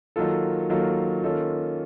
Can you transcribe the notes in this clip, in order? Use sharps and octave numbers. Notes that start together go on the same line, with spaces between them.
D#3 F#3 A#3 F4 A4
D#3 F#3 A#3 F4 A4
D#3 A#3 C#4 F4 A4